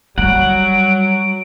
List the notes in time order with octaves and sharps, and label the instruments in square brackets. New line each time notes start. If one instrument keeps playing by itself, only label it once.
[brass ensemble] F#3 [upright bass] G3 [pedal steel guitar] F#5 [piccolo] D7